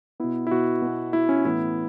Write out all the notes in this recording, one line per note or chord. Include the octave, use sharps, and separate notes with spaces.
B2 B3 E4
E4
B2 B3 F#4
B2
B3
B2 B3 E4
C#4
A2 E3 B3 E4